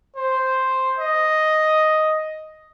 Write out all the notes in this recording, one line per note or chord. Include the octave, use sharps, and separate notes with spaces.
C5
D#5